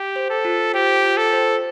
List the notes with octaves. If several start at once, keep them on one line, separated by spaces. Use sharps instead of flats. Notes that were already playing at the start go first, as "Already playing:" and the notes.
Already playing: G4
C5
A4
F4
G4 C5
F4
A4
C5